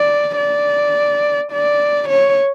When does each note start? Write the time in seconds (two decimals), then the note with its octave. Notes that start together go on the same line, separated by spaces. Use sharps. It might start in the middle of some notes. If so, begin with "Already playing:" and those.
Already playing: D5
0.37 D5
1.52 D5
2.09 C#5